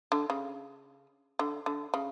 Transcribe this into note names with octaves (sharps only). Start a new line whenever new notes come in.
D3
C#3
D3
D3
C#3